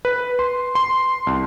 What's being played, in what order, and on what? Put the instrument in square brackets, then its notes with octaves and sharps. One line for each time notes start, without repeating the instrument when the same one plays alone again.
[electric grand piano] B4
C6
C6
C2